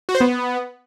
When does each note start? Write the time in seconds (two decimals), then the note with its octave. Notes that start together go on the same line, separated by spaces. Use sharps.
0.09 F#4
0.15 C5
0.21 B3